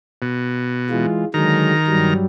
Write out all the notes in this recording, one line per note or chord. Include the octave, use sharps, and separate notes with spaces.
B2
E3 G#3 F4
D3 D#3 F#3 G#3 A#5
G2 F#3 G3